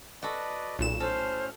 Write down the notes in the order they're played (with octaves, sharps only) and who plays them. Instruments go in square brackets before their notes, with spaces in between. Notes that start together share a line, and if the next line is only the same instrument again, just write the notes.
[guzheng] F#4 A4 [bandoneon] B4 D5 D#5
[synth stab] B1 A#2 E7 [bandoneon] C#3
[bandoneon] A2 C#4 F6 [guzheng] A4 [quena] C5